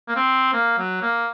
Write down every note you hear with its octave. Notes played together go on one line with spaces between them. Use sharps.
A#3
C4
A#3
F#3
A#3